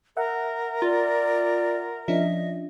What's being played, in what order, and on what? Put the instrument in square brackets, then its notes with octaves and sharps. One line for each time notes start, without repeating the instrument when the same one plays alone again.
[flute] A#4 [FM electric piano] E5 F#5
[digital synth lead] F4 [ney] D5
[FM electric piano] F3 C#4 D4 [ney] D#5 [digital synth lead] E5